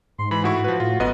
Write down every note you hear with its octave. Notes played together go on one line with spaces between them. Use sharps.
G#2 C6
E3 B5
A2 E4 F#4 C#6
F3 B4
A2 F4
G1 F#2 B3 D#5